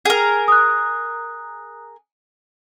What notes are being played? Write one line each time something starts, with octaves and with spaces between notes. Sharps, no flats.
G#4 A#4
D#6 F#6